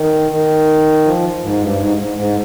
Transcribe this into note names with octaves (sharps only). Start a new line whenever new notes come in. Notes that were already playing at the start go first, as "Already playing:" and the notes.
Already playing: D#3
D#3
F3
G#2
G2
G#2
G#2
G#2